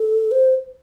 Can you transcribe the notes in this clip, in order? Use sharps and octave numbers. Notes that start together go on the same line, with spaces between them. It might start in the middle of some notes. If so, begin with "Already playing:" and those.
Already playing: A4
C5